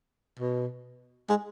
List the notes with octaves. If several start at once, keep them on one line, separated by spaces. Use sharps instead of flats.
B2
G#3